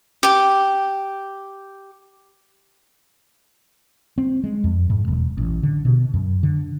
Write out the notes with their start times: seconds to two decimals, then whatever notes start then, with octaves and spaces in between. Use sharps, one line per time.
0.23 G4 D6
4.18 C4
4.44 G#3
4.64 F2
4.90 G#2
5.08 E1
5.38 A1
5.63 D3
5.85 B2
6.14 F#2
6.43 D3